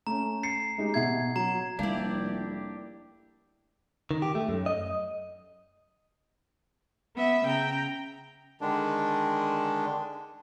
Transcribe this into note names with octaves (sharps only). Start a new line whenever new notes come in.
A3 C#4 A#5
C7 C#7
G#3 D#4 G4
B2 E5 G#6 C7
F#3 A#5
F1 G3 A#3 D4 E4 G4 D5
D#3
G4
A3
F#2
D#5
B3 E5
C#3 G5 A#5
D3 D#3 G#3 D4